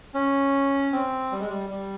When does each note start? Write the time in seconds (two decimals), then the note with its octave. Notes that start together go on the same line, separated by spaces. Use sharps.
0.14 C#4
0.93 C4
1.32 G3
1.40 G#3
1.49 G3
1.70 G3